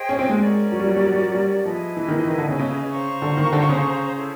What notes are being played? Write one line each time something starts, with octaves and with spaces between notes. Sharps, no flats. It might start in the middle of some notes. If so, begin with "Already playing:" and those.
Already playing: G#4 C5 D#5 G5
C#4
C4
G#3
C#4 F#4 A#4 D5
F#3
G3
F#3
G3
F#3
G3
F#3
G3
F3 E4 G#4 B4 D#5
E3
D#3
E3
D#3
D3
C#3
C#3
C5 F5 A#5 C#6
D3
D#3
D3
C#3
E4 A4 C5